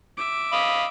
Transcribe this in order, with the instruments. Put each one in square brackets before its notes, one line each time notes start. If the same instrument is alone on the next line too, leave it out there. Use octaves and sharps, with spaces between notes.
[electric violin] E5 D6
[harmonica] D#5 F5 B5